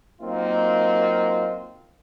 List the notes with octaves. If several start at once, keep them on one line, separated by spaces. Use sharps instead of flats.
F#3 A#3 C4 D#4 F4